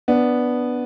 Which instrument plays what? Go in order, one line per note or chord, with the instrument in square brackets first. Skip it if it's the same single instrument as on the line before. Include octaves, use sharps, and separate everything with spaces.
[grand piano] B3 D4